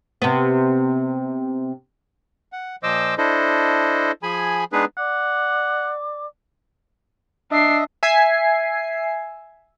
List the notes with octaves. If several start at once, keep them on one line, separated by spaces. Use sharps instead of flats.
C3 B3
F#5
A#2 F3 C5 D#5 D6 E6
D4 E4 A4 C5 D#5
F3 G#4 G#5 B5
G#3 B3 D4 D#4 G#4 B4
D5 F#5 D6
D4 D#5 E5 C7
E5 G#5 C7